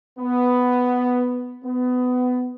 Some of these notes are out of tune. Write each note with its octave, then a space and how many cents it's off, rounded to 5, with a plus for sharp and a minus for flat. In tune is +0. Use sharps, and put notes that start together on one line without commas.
B3 +5
B3 +20